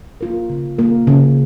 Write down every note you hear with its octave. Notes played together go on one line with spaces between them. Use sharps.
A#3 F4 A#4
C#3
A#3 F4 A#4
C#3